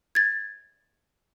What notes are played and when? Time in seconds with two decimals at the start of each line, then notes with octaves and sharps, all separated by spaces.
0.15 G#6 A6